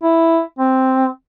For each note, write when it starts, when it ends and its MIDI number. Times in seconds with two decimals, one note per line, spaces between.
0.03 0.41 64
0.59 1.08 60